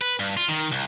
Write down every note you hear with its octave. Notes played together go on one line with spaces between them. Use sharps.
B4
G2
F4
D#3
C2